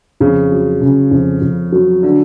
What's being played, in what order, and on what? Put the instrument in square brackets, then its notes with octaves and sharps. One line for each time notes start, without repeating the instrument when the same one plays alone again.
[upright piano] F2 [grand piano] C#3
[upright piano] F#3
C#3
F2
F2
F#3
[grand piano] D3